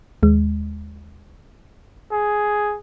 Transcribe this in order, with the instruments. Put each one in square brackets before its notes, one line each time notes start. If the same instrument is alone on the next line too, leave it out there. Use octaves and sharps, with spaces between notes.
[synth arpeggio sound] D#2 G#3
[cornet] G#4